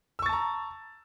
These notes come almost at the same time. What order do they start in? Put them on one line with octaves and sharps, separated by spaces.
E6 C#6 A6 A5 A#5